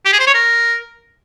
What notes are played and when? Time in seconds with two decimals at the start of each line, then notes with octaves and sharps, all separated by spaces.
0.05 G4
0.13 G#4
0.20 C5
0.27 C#5
0.34 A#4